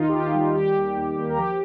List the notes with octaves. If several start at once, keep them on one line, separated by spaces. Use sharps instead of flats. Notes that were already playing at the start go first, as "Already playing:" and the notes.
Already playing: D#2 D#3 D#4 F4
G4
D#2 F4
G3
D#3 G4
D#2
D#2
A#3
A#4
F3 G4